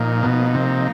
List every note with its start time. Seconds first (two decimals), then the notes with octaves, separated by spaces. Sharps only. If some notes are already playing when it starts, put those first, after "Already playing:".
Already playing: A#2 F3 A#3 D#4
0.23 B2
0.55 C3